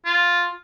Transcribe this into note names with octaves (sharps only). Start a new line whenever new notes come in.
F4